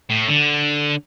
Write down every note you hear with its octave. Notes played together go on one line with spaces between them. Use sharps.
A2
D3